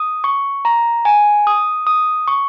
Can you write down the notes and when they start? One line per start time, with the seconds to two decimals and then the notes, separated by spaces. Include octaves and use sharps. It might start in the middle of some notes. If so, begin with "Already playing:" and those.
Already playing: D#6
0.24 C#6
0.65 A#5
1.05 G#5
1.47 D#6
1.87 D#6
2.28 C#6